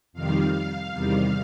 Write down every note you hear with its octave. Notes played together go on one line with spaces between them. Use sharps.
F2 C3 D#3 G3 F5
F5
E2 C3 D#3 G3